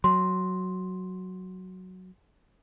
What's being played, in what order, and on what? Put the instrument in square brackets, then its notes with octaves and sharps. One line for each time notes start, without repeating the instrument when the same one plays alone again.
[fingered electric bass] F#3 [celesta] C6